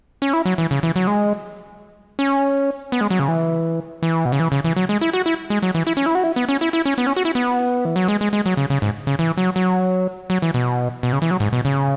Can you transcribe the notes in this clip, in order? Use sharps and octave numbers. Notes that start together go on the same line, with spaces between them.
C#4
E4
F#3
E3
C#3
E3
F#3
G#3
C#4
B3
G#3
F#3
C#3
E3
E3
B2
C#3
E3
C#3
E3
F#3
G#3
E4
F#4
E4
G#3
F#3
E3
E4
C#4
E4
F#4
E4
B3
C#4
E4
E4
C#4
B3
C#4
F#4
E4
B3
E3
F#3
G#3
G#3
G#3
F#3
C#3
C#3
G#2
C#3
E3
F#3
F#3
F#3
E3
B2
B2
C#3
E3
F#3
G#2
B2
C#3